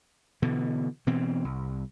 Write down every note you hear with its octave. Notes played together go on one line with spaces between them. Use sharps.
B2 D3 E3
B2 E3 C4
C2